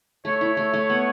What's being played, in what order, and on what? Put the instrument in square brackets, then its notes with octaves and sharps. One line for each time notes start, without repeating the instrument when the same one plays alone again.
[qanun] A3 [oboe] C#5
[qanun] E4
A3
A3
B3